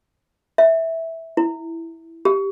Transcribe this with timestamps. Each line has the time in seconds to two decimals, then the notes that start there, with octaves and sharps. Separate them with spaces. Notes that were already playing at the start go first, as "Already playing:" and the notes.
0.58 E5
1.37 E4
2.25 G4